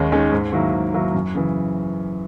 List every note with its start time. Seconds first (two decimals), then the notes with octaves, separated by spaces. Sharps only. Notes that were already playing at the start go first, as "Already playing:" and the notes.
Already playing: D#2 D#3 G#3 C#4
0.12 D#3 G#3 C#4
0.32 G#2
0.52 D#3 F#3 A#3 E4
0.73 G#2
0.94 D#3 F#3 A#3 E4
1.14 F#2
1.35 C#3 E3